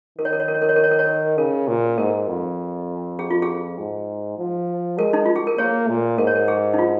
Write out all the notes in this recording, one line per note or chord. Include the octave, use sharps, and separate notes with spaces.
D#3 A#4
C#5
A#4
C#5
A#4
C#5
A#4
C#5
A#4
C#5
A#4
C#5
A#4
C#3 A#4
A#2
G#2 A#4
F2
G#4
F4
G#4
G#2
F3
G#3 A#4
D#4
F4
G#4
A#4
A#3 G#4 C#5
A#2
G#2 A#4
C#5
A#4
G#4
D#4
F4